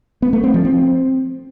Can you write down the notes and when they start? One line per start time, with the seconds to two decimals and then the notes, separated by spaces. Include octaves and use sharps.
0.22 B3
0.33 A3
0.44 C4
0.54 F3
0.65 C4